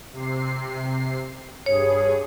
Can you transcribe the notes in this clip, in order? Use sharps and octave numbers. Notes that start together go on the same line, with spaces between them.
C3 C7
G2 G#4 C#5